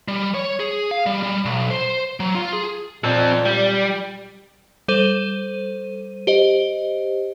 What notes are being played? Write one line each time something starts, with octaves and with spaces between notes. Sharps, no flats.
G3
C#5
G#4
F5
G3
G3
B1
C5
F#3
F4
G#4
A#2 C4 A4
G3
G3 A4 C5 D#7
G4 C5 D#5